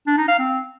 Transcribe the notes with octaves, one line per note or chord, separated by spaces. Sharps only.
D4
D#4
F5
C4